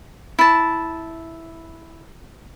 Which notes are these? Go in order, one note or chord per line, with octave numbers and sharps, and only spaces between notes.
E4 A5